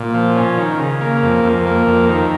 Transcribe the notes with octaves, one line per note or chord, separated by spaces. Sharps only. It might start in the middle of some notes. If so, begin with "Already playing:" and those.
Already playing: A#2
F3
C#4
D#3
C#3
A#3
F2
F2
A#3
F2
D#3